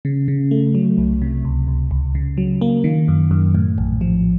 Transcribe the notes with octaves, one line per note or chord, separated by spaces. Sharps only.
C#3
C#3
A3
F#3
C2
C3
C#2
C#2
C#2
C#3
F#3
A#3
D#3
F#2
F#2
A2
A#1
F3